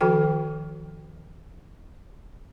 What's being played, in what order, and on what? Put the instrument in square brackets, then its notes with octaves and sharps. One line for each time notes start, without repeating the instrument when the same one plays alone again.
[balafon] D#3 F3 F#4 A4 G5